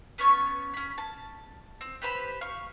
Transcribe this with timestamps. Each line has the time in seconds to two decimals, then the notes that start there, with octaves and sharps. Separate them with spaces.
0.18 B3 C#4 C#5 C#6
0.74 C#4 B5
0.98 A5
1.81 C4
2.02 G4 B4 C5 B5
2.41 F5 C#6